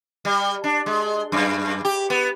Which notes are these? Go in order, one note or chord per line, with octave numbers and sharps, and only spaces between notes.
G3
D4
G#3
F#2
G4
B3